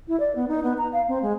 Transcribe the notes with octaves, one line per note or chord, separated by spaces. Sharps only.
E4
D5
B3
D#4
B3
A#5
F5
C4
G#3